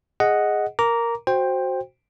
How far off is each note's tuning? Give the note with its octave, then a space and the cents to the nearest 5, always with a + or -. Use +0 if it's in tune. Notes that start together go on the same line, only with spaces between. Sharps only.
G#4 +0 D#5 +0 F#5 +0
A#4 +0 A#5 +0 D6 -20
F#4 +0 C5 +5 G5 +15